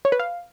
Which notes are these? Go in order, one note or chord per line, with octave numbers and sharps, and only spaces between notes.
C#5
B4
F5